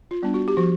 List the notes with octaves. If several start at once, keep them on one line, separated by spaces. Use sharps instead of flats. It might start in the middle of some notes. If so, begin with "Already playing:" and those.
F4
G3 B3 D4
F#4
G4
F3 F#4